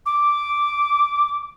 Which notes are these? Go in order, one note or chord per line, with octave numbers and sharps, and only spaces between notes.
D6